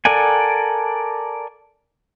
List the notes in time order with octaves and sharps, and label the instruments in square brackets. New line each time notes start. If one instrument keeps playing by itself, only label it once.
[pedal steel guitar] A4 A#4 D5 F#5 G#5